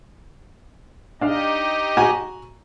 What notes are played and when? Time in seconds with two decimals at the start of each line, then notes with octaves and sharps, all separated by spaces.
1.21 D4 D#4 G4 D#5 F5
1.97 F#4 G#5 A#5